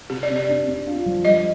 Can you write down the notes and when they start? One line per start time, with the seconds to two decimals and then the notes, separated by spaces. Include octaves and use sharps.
0.10 C3 G4
0.23 D5
0.30 C3
0.36 D5
0.48 D4
0.68 D4
0.87 F4
1.06 F3
1.25 G3 D#5